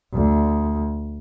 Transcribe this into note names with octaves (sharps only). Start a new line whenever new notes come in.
D2